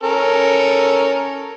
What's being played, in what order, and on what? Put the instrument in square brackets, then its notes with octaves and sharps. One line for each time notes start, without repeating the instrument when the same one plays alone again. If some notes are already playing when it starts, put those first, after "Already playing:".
[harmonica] C#4 A4 A#4